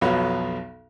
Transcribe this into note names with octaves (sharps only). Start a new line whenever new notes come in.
B1 F2 B2 B3 C#5 F5